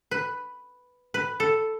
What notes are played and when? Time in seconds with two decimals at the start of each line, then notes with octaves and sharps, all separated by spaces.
0.11 B4
1.14 B4
1.40 A4